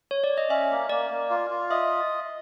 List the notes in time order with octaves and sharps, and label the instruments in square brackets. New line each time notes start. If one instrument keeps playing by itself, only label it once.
[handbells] C#5
D5
D#5
[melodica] C#4 [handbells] E5
[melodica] A#3
[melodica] A#3 [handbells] D5
[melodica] A#3
F4
F4
[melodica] D#5 [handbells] E5